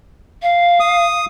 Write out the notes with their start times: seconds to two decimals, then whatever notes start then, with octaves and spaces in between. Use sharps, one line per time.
0.42 F5
0.80 D#6